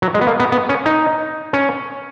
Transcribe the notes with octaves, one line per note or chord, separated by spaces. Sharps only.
F#3
G#3
B3
A#3
B3
B3
C#4
D#4
C#4